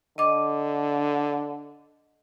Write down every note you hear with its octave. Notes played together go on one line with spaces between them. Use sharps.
D3 D#5 D6